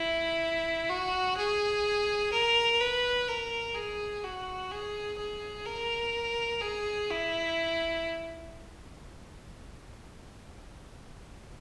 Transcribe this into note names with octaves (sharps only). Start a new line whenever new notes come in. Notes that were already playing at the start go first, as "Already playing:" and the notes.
Already playing: E4
F#4
G#4
A#4
B4
A#4
G#4
F#4
G#4
G#4
A#4
G#4
E4